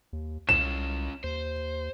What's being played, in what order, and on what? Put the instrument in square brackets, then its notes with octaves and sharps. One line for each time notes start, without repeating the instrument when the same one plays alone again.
[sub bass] D#2
[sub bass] C2 [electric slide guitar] C#4 F4 [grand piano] E7
[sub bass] D#2 [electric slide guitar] C5